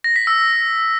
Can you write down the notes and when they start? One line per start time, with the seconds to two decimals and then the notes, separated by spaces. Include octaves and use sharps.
0.04 A#6
0.16 B6
0.27 E6